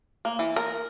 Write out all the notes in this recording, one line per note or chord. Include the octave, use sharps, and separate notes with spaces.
A#3
E3
A#4